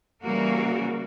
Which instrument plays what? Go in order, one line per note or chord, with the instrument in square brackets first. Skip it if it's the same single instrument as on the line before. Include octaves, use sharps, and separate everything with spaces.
[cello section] C#3 E3 G3 A#3 F#4 A#4